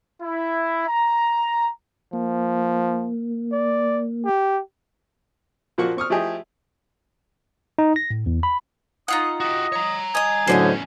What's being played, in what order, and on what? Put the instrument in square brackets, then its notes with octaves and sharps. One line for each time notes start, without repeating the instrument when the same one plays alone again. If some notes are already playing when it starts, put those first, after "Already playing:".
[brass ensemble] E4
A#5
[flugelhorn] F3 [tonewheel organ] A#3
[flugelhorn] D5
G4
[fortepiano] A#2 F3 A#3 F#4 C#6
C4 C#6 D#6 F6
F3 A3 E4 G4 G#4 D#5
[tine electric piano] D#4
A#6
A2
E2
B5
[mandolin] D#4 F4 F#5 [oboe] D#6
[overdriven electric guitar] F#4 G4 [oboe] D#5
[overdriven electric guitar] C#5 A#5
[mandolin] D#5 D#6 [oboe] G#5
[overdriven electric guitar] E2 C#4 [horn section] A2 D3 F#3 [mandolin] C5 D5 D#5